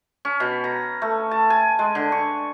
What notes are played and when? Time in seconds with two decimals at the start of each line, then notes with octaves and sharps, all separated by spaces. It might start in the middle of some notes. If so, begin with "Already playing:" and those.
0.25 C#4
0.40 B2
0.64 A#5
1.02 A3
1.31 A5
1.50 G#5
1.79 G#3
1.95 D3
2.12 C#6